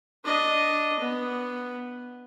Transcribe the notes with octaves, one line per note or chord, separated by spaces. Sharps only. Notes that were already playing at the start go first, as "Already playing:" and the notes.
D4 D#5
B3